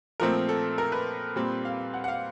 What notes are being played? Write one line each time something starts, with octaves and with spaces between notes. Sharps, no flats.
A#2 F3 A3 C4 A#4
A4
A#4
B4
A#2 G3 C4
F5
F#5
F#5
F5